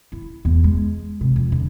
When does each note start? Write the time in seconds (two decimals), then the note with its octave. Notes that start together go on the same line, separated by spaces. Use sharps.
0.12 E4
0.45 E2
0.64 G#3
1.21 C3
1.36 F2
1.52 D3